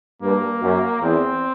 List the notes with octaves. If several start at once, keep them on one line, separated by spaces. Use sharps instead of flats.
G2 A#3
F#2
E2 C4